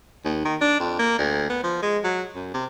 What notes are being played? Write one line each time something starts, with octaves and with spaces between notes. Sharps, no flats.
D#2
D#3
D4
F2
A#3
D2
B3
F3
G#3
F#3
F#2
C3